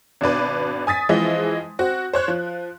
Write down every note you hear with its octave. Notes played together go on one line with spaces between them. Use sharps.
G#1 B2 D4 B4
G#5 D#6 A6 B6
E3 F3 G#3 C4 E4
C4 F#4
C5 C#5 F#6
F3